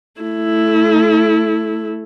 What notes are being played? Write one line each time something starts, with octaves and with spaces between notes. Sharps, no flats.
A3 E4